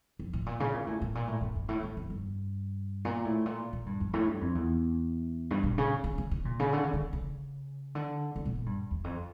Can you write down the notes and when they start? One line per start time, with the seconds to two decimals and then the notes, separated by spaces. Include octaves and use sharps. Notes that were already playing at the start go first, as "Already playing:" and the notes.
0.19 F2
0.33 A2
0.46 A#2
0.60 C#3
0.74 A#2
0.87 A2
1.02 A2
1.15 A#2
1.28 A2
1.41 G2
1.56 G2
1.69 A2
1.83 A2
1.97 F2
2.10 G2
3.05 A#2
3.25 A2
3.46 A#2
3.73 A#2
3.86 G2
4.00 F2
4.13 A2
4.28 G2
4.41 F2
4.55 E2
5.51 G2
5.64 A#2
5.78 C#3
6.04 D3
6.18 C#3
6.31 C#3
6.45 A#2
6.59 C#3
6.72 D3
6.84 C#3
6.93 D3
7.13 C#3
7.95 D3
8.36 C#3
8.45 A#2
8.56 A#2
8.66 G2
8.91 E2
9.04 F2